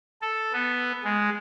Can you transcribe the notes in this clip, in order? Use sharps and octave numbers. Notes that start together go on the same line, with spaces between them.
A4
B3
G#3